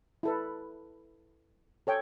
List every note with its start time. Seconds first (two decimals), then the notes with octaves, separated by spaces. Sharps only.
0.23 E4 A4 B4
1.87 A4 C#5 G5